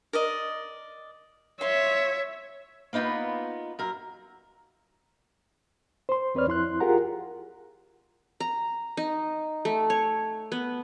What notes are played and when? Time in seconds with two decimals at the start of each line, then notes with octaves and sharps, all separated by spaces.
0.13 A#4 D5 D#5
1.61 C#5 E5 F5 C6
2.93 A#3 B3 D#4 F4 B4
3.79 F#2 A#4
6.09 C5 C6
6.34 E2 C4 B4 C#5 D5 F6
6.47 F2 E4 C6 F#6
6.80 F4 G4 G#4 A#4 F#5 A#5
8.40 A#5
8.97 D#4
9.65 A3
9.90 C#5
10.52 B3